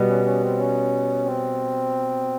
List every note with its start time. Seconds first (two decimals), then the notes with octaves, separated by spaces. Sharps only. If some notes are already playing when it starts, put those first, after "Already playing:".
Already playing: B2 G3 B3
0.09 C#4
0.25 C#4
0.43 C4
0.59 C#4
1.25 C4